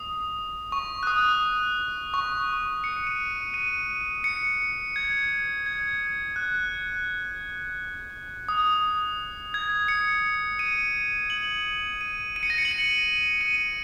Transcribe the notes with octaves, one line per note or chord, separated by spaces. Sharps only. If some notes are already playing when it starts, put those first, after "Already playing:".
Already playing: D#6
C#6
F#6
D#6
C#6
C#7
D#7
D#7
C#7
G#6
G#6
F#6
D#6
G#6
C#7
D#7
F#7
D#7
D#7
C#7
A#6
C#7
F#7
D#7
D#7